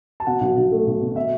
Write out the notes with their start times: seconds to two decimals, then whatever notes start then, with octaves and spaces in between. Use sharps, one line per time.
0.20 A5
0.27 B2 F#5
0.41 B1
0.57 B1
0.71 A3
0.87 B1
1.01 B2
1.16 B2 E5